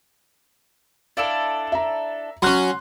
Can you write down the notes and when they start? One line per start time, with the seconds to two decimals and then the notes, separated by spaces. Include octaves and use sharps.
1.17 D4 E4 A4 F5
1.72 E5 A#5
2.42 F#3 C#4 F#4 C6 F#6